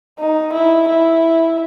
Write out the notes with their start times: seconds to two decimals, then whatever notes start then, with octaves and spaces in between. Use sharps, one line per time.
0.20 D#4
0.53 E4
0.88 E4